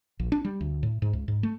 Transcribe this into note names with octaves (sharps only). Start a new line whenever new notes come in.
A#1
D4
G3
D2
A2
G#2
C#2
G#2
A3